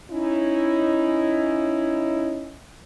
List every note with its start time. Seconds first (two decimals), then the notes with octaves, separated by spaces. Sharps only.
0.11 C#4 D#4 E4